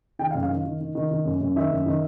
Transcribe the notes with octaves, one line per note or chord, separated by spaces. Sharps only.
D#3 G5
F5
F#2
F5
D#3
D#3
D#3
D#3
D#3
F#2
F#2
D#3 E5
F#2
D#3